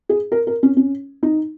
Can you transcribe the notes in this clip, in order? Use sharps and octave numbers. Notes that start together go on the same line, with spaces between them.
G#4
A#4
A#4
C#4
C#4
D#4